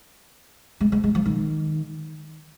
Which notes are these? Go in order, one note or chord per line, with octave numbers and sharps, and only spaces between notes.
G#3
G#3
G#3
F3
D#3